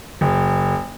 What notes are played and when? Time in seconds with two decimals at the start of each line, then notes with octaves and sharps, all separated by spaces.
0.21 F#1